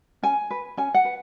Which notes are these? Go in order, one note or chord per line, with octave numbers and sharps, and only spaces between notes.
C#4 G#5
B4
C#4 G#5
F#5
B4